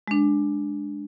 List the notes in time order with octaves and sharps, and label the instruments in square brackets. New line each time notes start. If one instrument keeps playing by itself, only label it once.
[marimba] G#3 D4